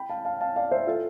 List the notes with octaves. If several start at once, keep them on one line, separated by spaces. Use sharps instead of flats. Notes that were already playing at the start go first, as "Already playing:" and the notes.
Already playing: G5 B5
F5 A5
F5 A5
F5 A5
D5 F5
C5 E5
F4 A4